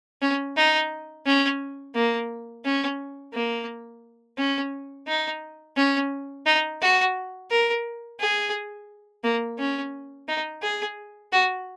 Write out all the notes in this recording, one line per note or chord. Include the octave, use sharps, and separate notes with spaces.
C#4
D#4
C#4
A#3
C#4
A#3
C#4
D#4
C#4
D#4
F#4
A#4
G#4
A#3
C#4
D#4
G#4
F#4